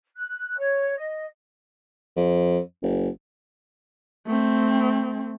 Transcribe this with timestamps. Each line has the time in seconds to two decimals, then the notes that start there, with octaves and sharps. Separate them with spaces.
0.16 F#6
0.57 C#5
0.97 D#5
2.16 F2
2.83 F#1
4.27 A3 C4